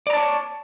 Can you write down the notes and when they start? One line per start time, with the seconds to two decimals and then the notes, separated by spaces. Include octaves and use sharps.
0.07 D5
0.10 A#5
0.13 A5
0.17 C#5